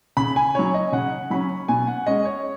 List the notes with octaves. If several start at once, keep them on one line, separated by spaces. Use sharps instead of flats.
C#3 B5
G#5
F#3 C#4 C#5
D#5
C#3 F#5
F#3 C#4 B5
B2 G#5
F#5
G#3 C#4 D#5
C#5